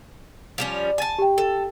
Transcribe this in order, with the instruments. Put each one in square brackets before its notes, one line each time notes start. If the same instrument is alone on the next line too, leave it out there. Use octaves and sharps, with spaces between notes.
[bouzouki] F3 G3 C#4
G#5 A5
[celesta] G4 G5
[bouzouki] A4